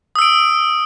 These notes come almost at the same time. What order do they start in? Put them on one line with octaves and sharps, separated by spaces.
D#6 E6 D7